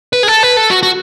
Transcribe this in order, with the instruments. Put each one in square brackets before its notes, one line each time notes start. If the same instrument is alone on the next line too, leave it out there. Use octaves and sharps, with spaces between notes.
[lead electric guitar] B4
G#4
A4
B4
A4
F#4
F#4